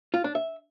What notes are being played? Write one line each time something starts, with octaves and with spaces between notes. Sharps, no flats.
F4
D4
E5